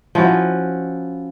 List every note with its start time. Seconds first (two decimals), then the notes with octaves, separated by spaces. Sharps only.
0.15 F3 C#4 E4 F#4